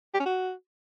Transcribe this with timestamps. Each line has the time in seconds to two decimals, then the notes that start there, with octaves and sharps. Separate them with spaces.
0.14 G4
0.20 C#4
0.26 F#4